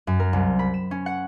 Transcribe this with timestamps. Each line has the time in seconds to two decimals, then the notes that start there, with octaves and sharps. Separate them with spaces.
0.07 F#2
0.20 A#4
0.33 C2
0.59 B5
0.74 E7
0.91 C#4
1.06 F#5